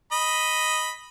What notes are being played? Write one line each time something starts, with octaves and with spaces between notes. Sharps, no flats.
D#5 B5